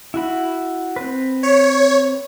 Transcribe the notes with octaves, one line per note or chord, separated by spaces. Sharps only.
E4 F#4 B5
C4 B4
C#5